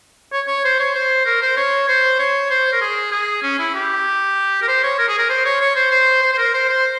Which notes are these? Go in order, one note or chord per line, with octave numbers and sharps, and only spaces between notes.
C#5
C#5
C5
C#5
C5
A#4
C5
C#5
C5
C#5
C5
A#4
G#4
G#4
C#4
E4
G4
A#4
C5
C#5
A#4
G#4
A#4
C5
C#5
C#5
C5
C5
C5
C5
A#4
C5
C5